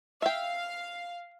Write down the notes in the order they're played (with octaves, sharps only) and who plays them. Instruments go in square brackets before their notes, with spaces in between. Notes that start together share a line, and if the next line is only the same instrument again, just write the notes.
[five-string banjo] E5 G5 [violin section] F5